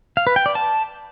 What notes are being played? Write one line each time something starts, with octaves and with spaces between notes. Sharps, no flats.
F5
B4
G5
D5
A5